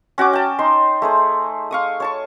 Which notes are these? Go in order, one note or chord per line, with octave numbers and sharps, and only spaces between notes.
C#4 F#4 F#5 D6
G5 A5
D#4 C6
A3 G#4 C5
F5 C#6 D#6
C#5 A5 C#6